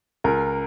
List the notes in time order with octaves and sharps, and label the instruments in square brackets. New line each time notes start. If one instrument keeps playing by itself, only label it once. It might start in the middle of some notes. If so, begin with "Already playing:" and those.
[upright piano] C#2 A#4